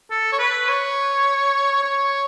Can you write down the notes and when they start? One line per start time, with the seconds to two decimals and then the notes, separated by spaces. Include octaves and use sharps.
0.11 A4
0.32 C#5
0.39 B4
0.69 C#5
1.83 C#5